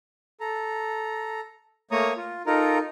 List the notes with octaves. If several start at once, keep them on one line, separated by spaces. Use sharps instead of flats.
A4 A#5
A3 A#3 C#5 A#5 C#6 D#6
F4
D#4 F4 A4 A#4 A#5